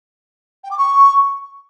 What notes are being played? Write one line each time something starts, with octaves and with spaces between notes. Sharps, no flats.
G5
D6
C#6